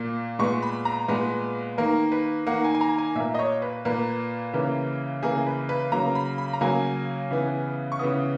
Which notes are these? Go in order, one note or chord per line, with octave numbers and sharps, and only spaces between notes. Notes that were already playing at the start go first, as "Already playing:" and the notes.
Already playing: A#2 A#3
A#2 G#3 B3 C#6
B5
A#5
A#2 G#3 B3 B4
D#3 A#3 A#4
B4
D#3 A#3 F#5
G#5
G#5
A#5
G#5
A#2 A#3 E5
D#5
C#5
B4
A#2 A#3 B4
C#3 E3 A#3
C#3 E3 A#3 G#4
B4
B4
C#3 F#3 A#3 A#5
B5
B5
A#5
C#3 F#3 A#3 G#5
C#3 E3 B3
C#6
C#3 E3 B3 D#6